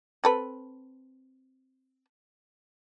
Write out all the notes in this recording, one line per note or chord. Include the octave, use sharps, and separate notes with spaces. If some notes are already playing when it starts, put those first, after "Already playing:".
C4 A4 B4